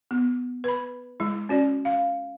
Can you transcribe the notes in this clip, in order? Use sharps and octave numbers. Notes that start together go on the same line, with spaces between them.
B3
B4 B5
G#3 E4
C#4 F#4 D5
F5